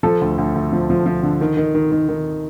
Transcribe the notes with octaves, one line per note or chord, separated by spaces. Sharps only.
F3 A4
D2
D2
D2
F3
F3
F3
D3
D#3
D#3
D#3
D#3
D#3